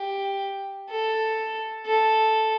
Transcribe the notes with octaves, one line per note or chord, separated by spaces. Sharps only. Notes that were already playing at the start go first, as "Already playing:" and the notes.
Already playing: G4
A4
A4